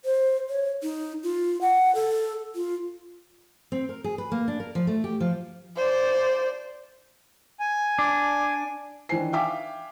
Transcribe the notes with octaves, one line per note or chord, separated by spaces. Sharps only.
C5
C#5
D#4
F4
F#5
A4
F4
C4
A#4
G#4
B4
A#3
D4
A#4
F3
A3
G4
F3
C5 D5
G#5
D4
D#3 E3 D4 C5 G#5 C7
E5 F5 G5 G#5 D6 B6